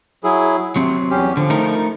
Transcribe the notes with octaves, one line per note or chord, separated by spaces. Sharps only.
F#3 E4 G#4
C3 F#3 C4
E2 C#4 G4
D3 F3
A3 D#4 A#4